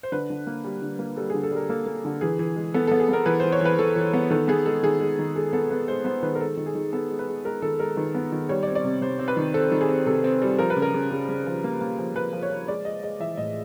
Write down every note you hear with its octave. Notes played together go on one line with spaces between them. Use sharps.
C5
D3 B4
D3
A#3
G3
D3
A#3
G3 A4
D3 G#4
A4
G3 A#4
A#3 A4
A#3
D3
E3 G#4
E3
G#3
B3 A4
B3 A4
G#4
B3 A#4
E3 B4
E3 C5
C#5
E3 B4
E3 A4
E3
B3
D#3 A4
B3 G#4
G#3 A4
D#3 G#4
G#3
D#3
G#3 A4
B3 A4
B3 B4
G#3 C5
B3 C5
D#3 B4
A#4
G#3 A4
D#3
G#4
D#3
B3 A4
G#3
B4
G#3
G#3 A#4
D#3 A4
G#3 A#4
D#3 B4
B3
D#3
G3 C#5
D5
C4
D5
C3
C3 C5
C4
B4
D#3
C4 A4
D#3
G#4
C4
C3 A4
C4
G3
F3 A#4
B4
C#3
A#4
C#3
C#3
C#3
F3
A#3
A#3
F3
F3 B4
F3
C#5
F3
G#3 D5
G#3 D#5
G#3 D#5
E3 E5
A2 D#5